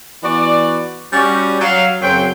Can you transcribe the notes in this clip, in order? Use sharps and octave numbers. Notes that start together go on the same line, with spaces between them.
E3 B3 F#4 D5
G3 C#4 F#4
F#3 F5
F#2 C#3 F#3 C4 C5 G5